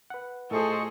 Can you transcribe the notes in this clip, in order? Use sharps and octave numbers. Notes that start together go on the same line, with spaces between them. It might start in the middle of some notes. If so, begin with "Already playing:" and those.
B4 F#5
A2 A3 F4 G#4 A4 C5 D#5 C#6